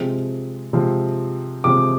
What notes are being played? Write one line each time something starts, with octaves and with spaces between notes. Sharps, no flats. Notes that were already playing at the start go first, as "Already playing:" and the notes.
Already playing: C3 F3 G#3 C4
C3 F3 G#3 C4
C3 F3 G#3 C4 D6